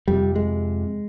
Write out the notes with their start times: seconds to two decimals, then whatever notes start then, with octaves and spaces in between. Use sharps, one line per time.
0.08 F2 C3 G3
0.35 G#3